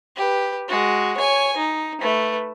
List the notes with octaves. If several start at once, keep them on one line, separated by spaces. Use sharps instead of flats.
G4 B4
G#3 F#4
C#5 G#5
D#4
A3 B4